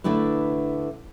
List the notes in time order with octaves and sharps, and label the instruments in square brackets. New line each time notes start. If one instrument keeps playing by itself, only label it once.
[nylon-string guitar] D3 A3 D4 E4 B4